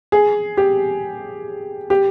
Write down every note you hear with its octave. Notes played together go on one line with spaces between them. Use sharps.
G#4
G4
G4